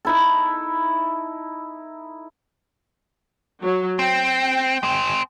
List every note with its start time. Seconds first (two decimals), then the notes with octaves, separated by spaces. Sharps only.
0.05 D#4 E4 A4
3.63 F#3
3.99 C4 G5
4.83 G#3 C4